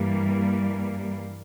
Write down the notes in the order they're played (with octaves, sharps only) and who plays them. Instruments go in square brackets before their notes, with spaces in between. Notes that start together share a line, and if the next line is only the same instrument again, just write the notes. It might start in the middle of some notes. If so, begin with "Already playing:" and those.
Already playing: [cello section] G2 E3 G3 A#3